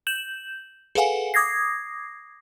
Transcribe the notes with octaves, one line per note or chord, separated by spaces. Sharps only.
G6 E7 F#7
G#4 A4 B4 F5 F#5 G#5
D6 D#6 G#6 A#6 C7